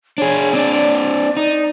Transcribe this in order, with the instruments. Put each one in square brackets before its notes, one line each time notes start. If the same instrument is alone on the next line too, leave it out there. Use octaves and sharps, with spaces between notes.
[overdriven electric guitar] D4 G#4 [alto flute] C#5
[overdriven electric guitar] C4 D4 [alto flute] D5
[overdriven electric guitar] D#4